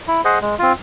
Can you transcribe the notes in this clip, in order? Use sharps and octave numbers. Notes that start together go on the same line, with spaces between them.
E4
G#4 C5 D#5 F#5
G#3
C4 F4